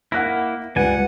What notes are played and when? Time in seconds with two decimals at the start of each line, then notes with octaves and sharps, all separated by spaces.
0.12 A#3 E4 F#5 F#6 A#6
0.76 C#2 G3 B4 F#5 G#5